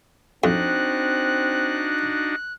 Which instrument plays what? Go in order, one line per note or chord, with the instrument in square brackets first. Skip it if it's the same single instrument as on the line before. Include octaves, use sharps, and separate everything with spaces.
[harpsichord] F2 [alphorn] C4 [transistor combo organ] D4 D#4 F#4 [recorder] F#6